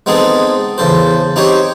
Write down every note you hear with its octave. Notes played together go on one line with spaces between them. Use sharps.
G#3 B3 C4 D#4 G#4 A4
E2 C#3 A4 C5
C4 D#4 G4 C5 C#5